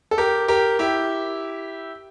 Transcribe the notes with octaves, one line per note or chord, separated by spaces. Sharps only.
A4
G4 A#4
G4 A#4
E4 G4